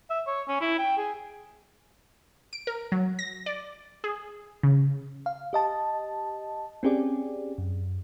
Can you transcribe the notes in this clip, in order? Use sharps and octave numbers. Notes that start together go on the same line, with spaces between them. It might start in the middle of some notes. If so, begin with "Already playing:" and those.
E5
C#5
C#4
E4
G5
G#4
D7
A#4
F#3
A#6
D5
G#4
C#3
F5
G4 D#5 A5
C4 C#4 G4 G#4 D5
F#2